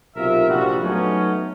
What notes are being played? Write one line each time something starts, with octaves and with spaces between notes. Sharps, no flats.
B1 C3 F4 A#4 E5
A#1 F2 C3 G3 F#4
F#3 A3 B3 C#4 D#4